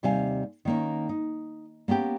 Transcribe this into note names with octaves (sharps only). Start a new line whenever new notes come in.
D#2 C3 G3 F5 G#5
D#3 A#3 C#4
D#4
A#3 B3 C#4 G4